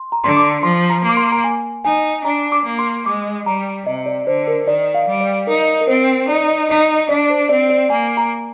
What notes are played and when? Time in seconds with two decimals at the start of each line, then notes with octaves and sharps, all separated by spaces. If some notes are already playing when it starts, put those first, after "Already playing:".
Already playing: C6
0.12 A#5
0.23 D3 C6
0.37 D6
0.63 F3 C6
0.90 A#5
1.03 A#3
1.09 D6
1.17 C6
1.32 A#5
1.44 G#5
1.84 D#4 G#5
2.24 D4 A#5
2.52 D6
2.65 A#3
2.79 C6
3.06 G#3 D6
3.46 G3 A#5
3.86 C3 D#5
4.06 D5
4.27 D3 C5
4.47 A#4
4.67 D#3 D5
4.94 F5
5.07 G3
5.21 D5
5.47 D#4 A#4
5.81 A#4
5.88 C4 C5
6.28 D#4 D5
6.69 D#4 D#5
7.09 D4 D5
7.30 C5
7.49 C4 D5
7.70 D5
7.90 A#3 G#5
8.17 A#5